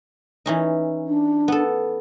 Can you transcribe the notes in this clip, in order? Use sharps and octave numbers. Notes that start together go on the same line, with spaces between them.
E3 C#4 D#4
D4
B3 A4